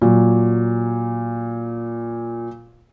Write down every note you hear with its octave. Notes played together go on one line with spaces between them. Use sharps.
A#2 F#3